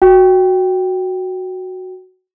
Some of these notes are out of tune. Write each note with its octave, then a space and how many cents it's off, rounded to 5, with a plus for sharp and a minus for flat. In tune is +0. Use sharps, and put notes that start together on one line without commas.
F#4 +0 G5 +0